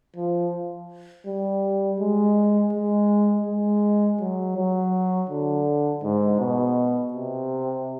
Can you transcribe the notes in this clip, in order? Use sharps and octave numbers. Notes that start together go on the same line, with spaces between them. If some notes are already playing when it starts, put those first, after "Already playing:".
F3
G3
G#3
G#3
G#3
F#3
F#3
D3
G#2
B2
C3